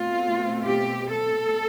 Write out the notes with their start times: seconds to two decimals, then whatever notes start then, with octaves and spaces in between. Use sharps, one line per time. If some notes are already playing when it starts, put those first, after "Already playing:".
Already playing: B2 A3 C4 F4
0.65 G4
1.12 A4